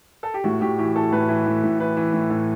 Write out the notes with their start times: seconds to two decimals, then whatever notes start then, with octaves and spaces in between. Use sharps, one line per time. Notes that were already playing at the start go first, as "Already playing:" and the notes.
0.23 A4
0.34 G4
0.44 A2 F#4
0.61 A2 G4
0.78 E3 G4
0.95 E3 A4
1.12 A2 B4
1.29 E3
1.46 A2
1.63 A2
1.79 E3 B4
1.97 E3
2.13 A2
2.30 A2